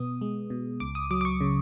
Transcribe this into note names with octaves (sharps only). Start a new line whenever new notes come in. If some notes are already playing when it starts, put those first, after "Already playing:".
Already playing: B2 B3 D#6
G#3
B2
C#2 D6
D#6
F#3 D6
D6
C#6
C#3